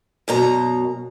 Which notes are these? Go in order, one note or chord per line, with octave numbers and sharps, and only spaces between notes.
F#2 B2 A#5